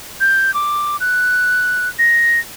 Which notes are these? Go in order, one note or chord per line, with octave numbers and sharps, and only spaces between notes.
G6
D6
F#6
A#6